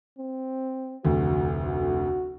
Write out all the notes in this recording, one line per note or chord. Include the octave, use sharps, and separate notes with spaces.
C4
F1 D2 F#4
F#4